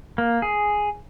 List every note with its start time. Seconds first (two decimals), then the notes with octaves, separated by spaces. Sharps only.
0.18 A#3
0.42 G#4